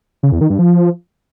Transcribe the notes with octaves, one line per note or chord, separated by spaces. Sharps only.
C#3
E2
D#3
G2
F3